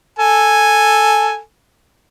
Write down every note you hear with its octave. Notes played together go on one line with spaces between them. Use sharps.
A4 G#5